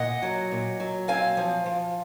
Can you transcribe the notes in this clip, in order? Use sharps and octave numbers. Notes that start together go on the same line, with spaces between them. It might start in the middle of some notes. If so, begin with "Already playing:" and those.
Already playing: A#2 D#5 F#5
F#3
A#2
F#3
C4 F5 G#5
F3
F3